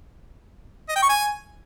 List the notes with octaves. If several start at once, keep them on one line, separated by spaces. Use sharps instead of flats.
D#5
G5
C#6
G#5